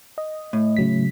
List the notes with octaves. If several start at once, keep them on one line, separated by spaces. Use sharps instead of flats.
D#5
A2
C#3 F#3 B6